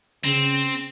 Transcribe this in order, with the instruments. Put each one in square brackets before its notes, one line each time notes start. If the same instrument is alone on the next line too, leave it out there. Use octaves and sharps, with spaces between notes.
[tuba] C#3 [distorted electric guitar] C4